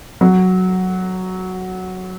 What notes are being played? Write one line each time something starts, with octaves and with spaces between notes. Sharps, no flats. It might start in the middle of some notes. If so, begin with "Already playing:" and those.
F#3